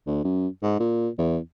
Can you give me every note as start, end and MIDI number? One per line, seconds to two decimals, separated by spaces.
0.07 0.21 38
0.24 0.48 42
0.62 0.78 44
0.79 1.09 46
1.18 1.38 40